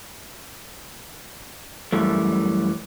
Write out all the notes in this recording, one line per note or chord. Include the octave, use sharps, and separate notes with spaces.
F#2 E3 G3 A3